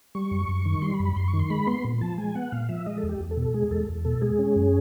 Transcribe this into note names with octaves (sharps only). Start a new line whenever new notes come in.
G3 C#6
F#2
F#2
D#3
G3 C6
B5
F#2
B5
F#2 C6
C#6
D#3
C6
G#3 B5
B3 C6
A#2
F3 A5
G#3 G#5
B3 F#5
A#2 F5
F3 E5
G#3 D#5
A4
E2
G4
E2
A4
B2
A4
G#3 G#4
E2 A4
E2
B2 A4
G#3 G#4
C#4
F#2